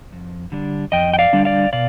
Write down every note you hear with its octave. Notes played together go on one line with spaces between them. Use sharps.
F2
D3 G3 D4
F2 D#5 G5
G5
D5 F5
D3 G3 D4
D5 F5
B2 D5 F5